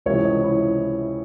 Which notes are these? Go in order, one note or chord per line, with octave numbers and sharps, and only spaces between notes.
C#2 C3 E3 C#5
D#5
E4